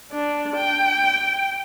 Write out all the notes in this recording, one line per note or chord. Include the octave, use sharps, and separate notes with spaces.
D4
G5